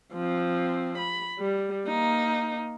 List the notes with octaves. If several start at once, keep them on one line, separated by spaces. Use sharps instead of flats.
F3 C4
B5
G3
A#3 D#4